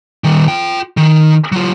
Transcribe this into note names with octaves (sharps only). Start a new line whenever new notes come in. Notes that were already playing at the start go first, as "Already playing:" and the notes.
D#3 G3
F4 G5
D#3
F#3 F4